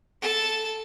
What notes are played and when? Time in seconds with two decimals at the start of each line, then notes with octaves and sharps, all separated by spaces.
0.21 A4 A5